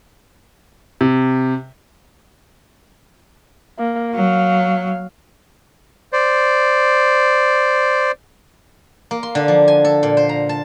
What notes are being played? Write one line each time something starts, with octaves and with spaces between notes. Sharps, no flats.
C3
A#3
F#3 F5
C5 D5
A#3
C6
D3
F3
G#5
A4
A#2
C5
A#5
A5